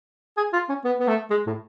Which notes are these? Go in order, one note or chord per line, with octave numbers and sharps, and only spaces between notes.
G#4
F4
C#4
B3
B3
A3
G#3
A2